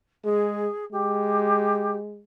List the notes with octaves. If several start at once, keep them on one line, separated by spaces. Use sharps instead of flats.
G#3 G#4
G#3 G4